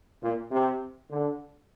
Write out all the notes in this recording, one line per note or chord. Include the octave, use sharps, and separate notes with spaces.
A#2
C3
D3